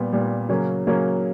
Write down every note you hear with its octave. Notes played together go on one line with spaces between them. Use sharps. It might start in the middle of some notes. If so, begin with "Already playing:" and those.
Already playing: A#2 G3 B3
A#2 G3 B3
C#3 F#3 A#3 C#4
C#3 F#3 A#3 C#4